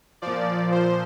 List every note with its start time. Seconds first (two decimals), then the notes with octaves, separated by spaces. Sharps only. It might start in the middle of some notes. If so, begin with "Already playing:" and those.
0.22 A#2 F3 D5
0.72 C5